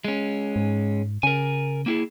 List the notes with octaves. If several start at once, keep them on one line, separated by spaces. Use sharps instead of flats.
G#3 C#4
G#2
C#3 A#4 G#5
A#3 E4 G#4